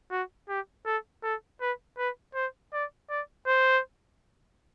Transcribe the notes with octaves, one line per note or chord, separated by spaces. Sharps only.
F#4
G4
A4
A4
B4
B4
C5
D5
D5
C5